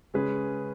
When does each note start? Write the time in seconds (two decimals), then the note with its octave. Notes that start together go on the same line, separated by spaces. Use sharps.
0.14 C#3 G#3 C#4 G#4 B4